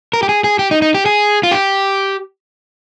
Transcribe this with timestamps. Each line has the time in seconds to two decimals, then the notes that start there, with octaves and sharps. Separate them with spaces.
0.13 A#4
0.23 G4
0.29 G#4
0.44 G#4
0.59 G4
0.71 D#4
0.82 D#4
0.95 G4
1.06 G#4
1.43 F4
1.51 G4